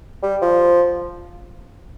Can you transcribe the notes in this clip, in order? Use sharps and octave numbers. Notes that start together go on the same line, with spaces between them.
G3
F3